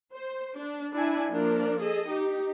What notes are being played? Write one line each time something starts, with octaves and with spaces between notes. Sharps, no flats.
C5
D4
D4 E4 G#5
F3 A#3 D4 A#4 D5
G#4 A4 D#5
D#4 G4